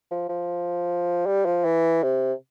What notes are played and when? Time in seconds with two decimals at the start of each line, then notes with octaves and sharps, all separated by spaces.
0.11 F3
0.29 F3
1.26 G3
1.45 F3
1.65 E3
2.03 C3